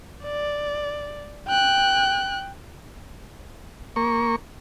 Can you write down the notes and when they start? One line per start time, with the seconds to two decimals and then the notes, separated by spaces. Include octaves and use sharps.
0.24 D5
1.48 G5 F#6
3.96 A#3 C#6